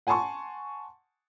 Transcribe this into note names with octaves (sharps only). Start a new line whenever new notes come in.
F#5 G#5 A5 C6 C#6